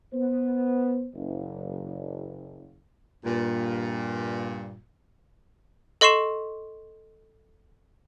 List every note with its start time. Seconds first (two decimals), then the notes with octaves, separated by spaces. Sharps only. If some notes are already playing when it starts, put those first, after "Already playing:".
0.13 B3 C5
1.15 F#1
3.25 G2 A#2
6.01 A4 D#5 C6 C#6 C7 E7